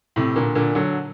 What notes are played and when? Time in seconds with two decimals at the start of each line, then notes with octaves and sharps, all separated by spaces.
0.16 A2 C3
0.36 A#2 D3
0.55 A#2 D3
0.75 D3 F#3